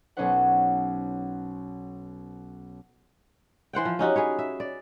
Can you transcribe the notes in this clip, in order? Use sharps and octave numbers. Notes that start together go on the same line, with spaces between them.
B1 B2 C#4 D#4 C5 F#5
E3 C5 F#5 G5
F3
C#4 D#4 F#4 G4
G#4 B4 C#5
E5
D5